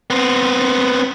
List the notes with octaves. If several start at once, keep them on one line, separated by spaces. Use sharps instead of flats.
B3 C4